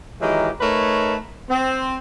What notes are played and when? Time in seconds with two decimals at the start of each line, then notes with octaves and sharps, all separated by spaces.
0.21 D#3 E3 F#3 G#3 G4 A#4
0.60 A3 D#4 A#4 B4 C#5
1.49 C4